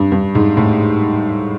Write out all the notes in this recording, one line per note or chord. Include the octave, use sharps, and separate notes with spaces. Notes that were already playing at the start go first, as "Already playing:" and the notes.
Already playing: G2
G2
G#2
A2